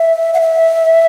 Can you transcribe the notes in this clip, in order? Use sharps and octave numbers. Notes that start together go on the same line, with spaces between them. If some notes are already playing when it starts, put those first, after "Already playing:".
Already playing: E5
F#5
E5